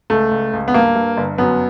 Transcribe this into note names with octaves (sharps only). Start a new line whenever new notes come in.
C#2 A3
C#2
C#2
B3
G2 A#3
G2
G1
F#2 B3